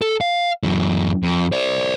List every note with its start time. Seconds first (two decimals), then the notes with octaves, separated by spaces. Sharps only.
0.02 A4
0.21 F5
0.63 F#2 E3
1.23 F2
1.52 C5 D5